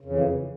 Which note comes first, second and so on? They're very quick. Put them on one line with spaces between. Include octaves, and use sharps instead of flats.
C#3 F2 E3